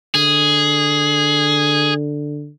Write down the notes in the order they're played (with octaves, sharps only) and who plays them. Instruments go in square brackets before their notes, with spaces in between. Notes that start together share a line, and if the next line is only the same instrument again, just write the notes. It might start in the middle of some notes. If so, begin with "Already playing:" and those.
[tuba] D3 [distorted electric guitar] G#4